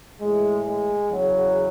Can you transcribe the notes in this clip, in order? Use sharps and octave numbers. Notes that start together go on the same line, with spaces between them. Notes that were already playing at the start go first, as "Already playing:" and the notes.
A2 E3 G#3
G#3
E2 C#3 F#3